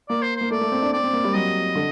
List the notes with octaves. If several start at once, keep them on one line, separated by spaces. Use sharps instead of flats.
A#3 D5
C5
A#3 C5
A3 D5
A3
C4
D4
C4 D5
C4
A#3
G3
F#3 D#5
D3